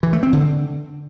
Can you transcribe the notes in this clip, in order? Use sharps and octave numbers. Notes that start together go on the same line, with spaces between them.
E3
A3
C4
D3